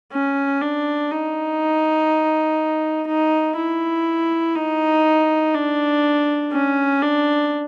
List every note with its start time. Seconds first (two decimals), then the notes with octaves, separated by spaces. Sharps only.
0.13 C#4
0.62 D4
1.11 D#4
3.08 D#4
3.57 E4
4.55 D#4
5.54 D4
6.53 C#4
7.02 D4